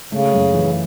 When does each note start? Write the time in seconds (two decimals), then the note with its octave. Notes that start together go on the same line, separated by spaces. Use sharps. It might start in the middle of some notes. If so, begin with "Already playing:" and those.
0.12 C#3 A3
0.33 F#2
0.54 E3